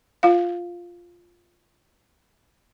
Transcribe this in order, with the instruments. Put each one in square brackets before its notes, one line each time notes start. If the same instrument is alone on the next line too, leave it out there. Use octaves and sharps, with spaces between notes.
[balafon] F4 F5